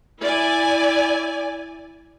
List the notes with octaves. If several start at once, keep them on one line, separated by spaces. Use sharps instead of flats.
E4 D5 G#5